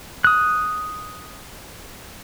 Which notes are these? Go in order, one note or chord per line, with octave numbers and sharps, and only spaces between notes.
D#6 F#6